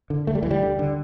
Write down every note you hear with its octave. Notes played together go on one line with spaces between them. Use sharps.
D3
D2 A3
G3
D2 E3
G3
D3
D3